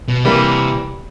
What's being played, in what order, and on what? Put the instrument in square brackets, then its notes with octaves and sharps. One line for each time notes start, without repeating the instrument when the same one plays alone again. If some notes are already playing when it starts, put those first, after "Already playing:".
[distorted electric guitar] B2
[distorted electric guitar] C3 [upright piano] E3 G3 A#3